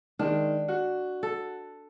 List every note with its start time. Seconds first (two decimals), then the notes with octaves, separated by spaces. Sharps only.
0.19 D#3 G#3 D4
0.68 F#4
1.23 A4